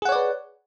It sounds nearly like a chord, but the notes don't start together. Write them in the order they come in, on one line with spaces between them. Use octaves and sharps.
G#4 F#5 C#5 D5 B4